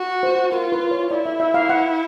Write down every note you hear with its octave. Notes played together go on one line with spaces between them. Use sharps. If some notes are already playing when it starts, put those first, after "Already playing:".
Already playing: F#4
C5
F4 A#4
B4
C#5
E4 D5
E5
E5
F5
F#5